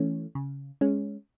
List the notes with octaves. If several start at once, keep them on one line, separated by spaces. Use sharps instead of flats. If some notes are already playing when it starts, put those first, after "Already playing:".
Already playing: E3 A3 C#4
C#3
G#3 C#4